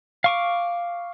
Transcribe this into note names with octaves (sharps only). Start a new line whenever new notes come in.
F5 C#6 D6